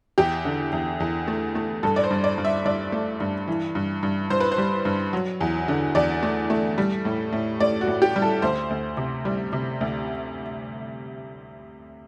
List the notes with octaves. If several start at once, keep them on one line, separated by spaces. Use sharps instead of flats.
E2 G4
D3
E2
E2
A3
A3
G2 A4
D5
C5
G2
D5
G2
E5
G2 D5
A3
G2
E3
G2
G2
G2 C5
B4
C5
G3
G2
F#3
E2
D3
E2 D5
A3
A3
G3
A2
A2
A2 D5
F#4
A2
G4
G3
A4
D2 C5
D2
C3
G3
C3
D2